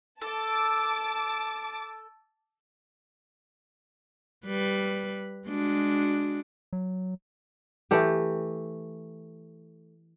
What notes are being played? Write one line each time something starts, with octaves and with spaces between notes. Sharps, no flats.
A4 A5 D6
G3 B4
G#3 D4 F#4
F#3
E3 A3 G4